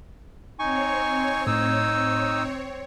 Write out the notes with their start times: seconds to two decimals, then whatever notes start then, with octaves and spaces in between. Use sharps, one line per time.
0.59 C4 D#4 C#5 G#5 C#6
1.47 A2 D#4 D#6 E6